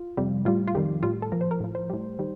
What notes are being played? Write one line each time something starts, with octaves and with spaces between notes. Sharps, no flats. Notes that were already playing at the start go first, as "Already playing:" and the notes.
Already playing: F4
F2 C3 G3
A2 G3 F4
F4
F2 D#3 G3 G4
A2 G3 F4
A4
A#2 F3 A#4
C5
A#4
A2 F3
C5
A2 G3
D#3 G3